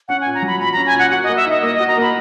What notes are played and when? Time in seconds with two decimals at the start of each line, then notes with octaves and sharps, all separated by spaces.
0.08 C#4 F#5
0.21 G#5
0.25 A#2
0.34 A#5
0.42 F#3 B5
0.59 A#2 B5
0.73 A#5
0.77 C#4
0.86 G#5
0.94 A#2
0.99 F#5
1.11 F#4 F#5
1.24 D#5
1.28 A#3
1.36 E5
1.46 D#4 D#5
1.62 A#3 D#5
1.76 F#4 D#5
1.88 A#5
1.97 A#3 B5